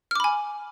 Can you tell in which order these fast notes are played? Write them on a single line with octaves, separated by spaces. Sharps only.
F6 D6 B5 G#5